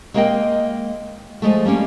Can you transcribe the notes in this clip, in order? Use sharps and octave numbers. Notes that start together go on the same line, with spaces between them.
G#3 A#3 A#4 C5 D#5 G5
F3 G#3 A3
G3 A#3 C#4 D5